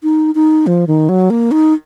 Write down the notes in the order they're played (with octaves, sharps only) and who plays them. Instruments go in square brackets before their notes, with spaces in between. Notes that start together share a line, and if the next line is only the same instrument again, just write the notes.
[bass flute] D#4
D#4
F3
D#3
F#3
A#3
D#4